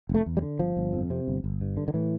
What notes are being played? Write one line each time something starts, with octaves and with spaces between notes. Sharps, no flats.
F1
A3
E2
G3
D3
G1 F3
G1
F2
C3
G1
G1
G2
D3
D3
A2 E3